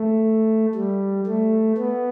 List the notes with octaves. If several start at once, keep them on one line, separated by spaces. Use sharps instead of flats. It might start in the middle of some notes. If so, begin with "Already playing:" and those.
Already playing: A3
G3
A3
B3